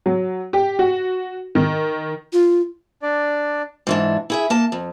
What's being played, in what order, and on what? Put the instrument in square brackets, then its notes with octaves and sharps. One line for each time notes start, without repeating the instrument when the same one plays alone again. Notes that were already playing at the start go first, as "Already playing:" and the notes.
[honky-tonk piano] F#3
G4
F#4
D#3
[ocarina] F4
[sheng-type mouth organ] D4 D5
[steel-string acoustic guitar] G#2 E3 D4
E4 G#4 E5
A#3 A5
F2